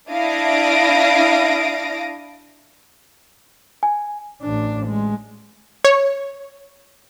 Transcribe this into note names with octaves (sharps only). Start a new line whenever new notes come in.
D4 E4 F5 D#6 A#6 D7
G#5
A1 D4
G#3
C#5